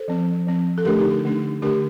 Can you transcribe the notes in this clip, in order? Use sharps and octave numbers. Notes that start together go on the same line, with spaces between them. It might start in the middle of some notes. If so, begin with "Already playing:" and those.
Already playing: A4 C5
F3 C4
F3 C4
A4
D3 A3 D4 G4 A#4
D#4 G4
D#4
D3 A3 D4
D3 A3 D4 G4 A#4